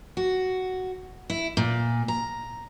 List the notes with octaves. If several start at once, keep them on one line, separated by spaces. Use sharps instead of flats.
F#4
E4
A#2
A#5